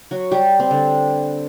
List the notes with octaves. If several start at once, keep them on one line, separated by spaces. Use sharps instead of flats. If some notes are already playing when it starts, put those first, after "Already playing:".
F#3 F#4
G3 G4
C4
D3 D4